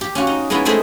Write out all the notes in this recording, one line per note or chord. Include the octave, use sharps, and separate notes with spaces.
G4
C#4 F4 F#4
D#4
G#3 B3 C#4 D#4 E4
G#3 A3 C4 G#4 C5 G#5